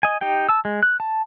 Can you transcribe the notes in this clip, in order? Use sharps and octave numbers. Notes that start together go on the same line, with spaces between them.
D#5 G#5
D#4 G4 G5
A5 E6
G#3
F#6
A5